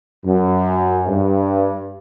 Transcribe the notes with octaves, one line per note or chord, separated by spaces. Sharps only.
F#2
G2